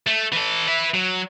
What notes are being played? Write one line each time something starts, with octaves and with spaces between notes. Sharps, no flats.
A3
E3 A4
B4 E5
F#3